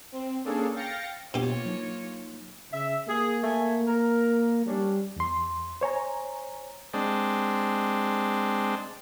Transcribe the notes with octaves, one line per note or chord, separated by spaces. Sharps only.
C4
A#3 C#4 D4 G#4 A4
F5 G5 A6 A#6 C#7
B2 A#3 D4 F4 G4 C#5
F#3 D#4
C#3 E5
A#3 G#4
A3 G#5
A#4
G3 C#4 D4
E2 C6
C5 C#5 G#5 A#5
G#3 C4 D4